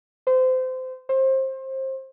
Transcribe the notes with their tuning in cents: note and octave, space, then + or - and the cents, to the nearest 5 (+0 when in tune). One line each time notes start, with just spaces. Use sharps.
C5 -25
C5 +25